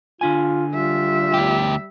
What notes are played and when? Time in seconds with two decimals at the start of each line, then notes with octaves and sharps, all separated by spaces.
0.21 D3 D4 F4 G#5
0.73 G3 F4 E5
1.34 D2 G4